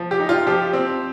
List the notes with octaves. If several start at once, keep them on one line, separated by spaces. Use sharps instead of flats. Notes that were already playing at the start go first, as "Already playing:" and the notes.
Already playing: F3
G4
D#4
F4
F3 G4
C4